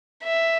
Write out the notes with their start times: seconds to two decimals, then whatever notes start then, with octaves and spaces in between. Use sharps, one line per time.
0.24 E5